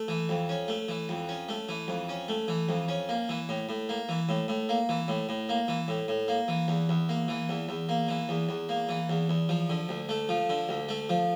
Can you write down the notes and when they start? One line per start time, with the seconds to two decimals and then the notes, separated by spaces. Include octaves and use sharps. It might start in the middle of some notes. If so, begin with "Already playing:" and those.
Already playing: A3
0.08 E3
0.29 F2
0.49 C#4
0.68 A3
0.88 E3
1.09 F2
1.29 C#4
1.49 A3
1.69 E3
1.88 F2
2.09 C#4
2.28 A3
2.48 E3
2.69 F2
2.88 C#4
3.09 A#3
3.29 E3
3.49 A2
3.69 A2
3.89 A#3
4.09 E3
4.29 A2
4.48 A2
4.69 A#3
4.89 E3
5.08 A2
5.29 A2
5.49 A#3
5.68 E3
5.88 A2
6.08 A2
6.28 A#3
6.48 E3
6.68 E2
6.89 E2
7.09 A#3
7.28 E3
7.49 E2
7.69 E2
7.89 A#3
8.08 E3
8.29 E2
8.49 E2
8.69 A#3
8.89 E3
9.09 E2
9.29 E2
9.49 F3
9.69 D3
9.89 D2
10.09 A3
10.29 F3
10.49 D3
10.69 D2
10.89 A3
11.09 F3